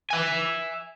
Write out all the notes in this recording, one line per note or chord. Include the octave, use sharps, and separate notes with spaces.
E5 G#5